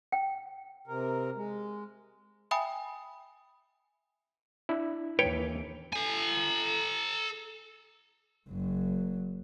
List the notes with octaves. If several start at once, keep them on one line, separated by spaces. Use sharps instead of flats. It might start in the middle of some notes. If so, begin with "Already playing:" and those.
G5
C3 A#4
G#3
E5 G5 G#5 B5 D#6
D4 E4
D#2 E3 B4 C#5 G5
A4 G#5
F#1 F#3